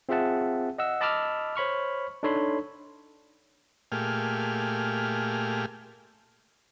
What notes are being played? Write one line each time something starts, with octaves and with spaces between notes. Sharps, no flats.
C4 F4 G#4 E5 F#5 A5
D#5 F#5 E6
D#5 A5 B5 D6 E6 F6
C5 C#5 B5 C#6 F6
D4 D#4 A4 C#5 B5 C6
A#2 A3 G4 G#4 F6